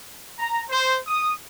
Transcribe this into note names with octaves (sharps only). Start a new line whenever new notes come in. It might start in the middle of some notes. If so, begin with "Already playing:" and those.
A#5
C5
D#6